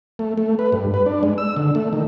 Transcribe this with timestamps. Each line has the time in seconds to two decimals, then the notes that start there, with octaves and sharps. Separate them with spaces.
0.19 A3
0.38 A3
0.59 B4
0.72 G2
0.94 B4
1.06 D4
1.23 G#3
1.38 E6
1.56 D3
1.75 A3
1.93 D#3